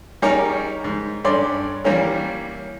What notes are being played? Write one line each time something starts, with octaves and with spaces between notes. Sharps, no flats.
G3 C#4 D#4 G#4 A#4 C#5
G#2
G2 C#4 A4 D5 C6
E3 G3 A#3 C#4 A#4